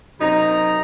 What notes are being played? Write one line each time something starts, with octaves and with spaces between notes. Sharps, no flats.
F#2 C3 D#4 A#5